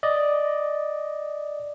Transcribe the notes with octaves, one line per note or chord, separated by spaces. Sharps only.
D5 D#5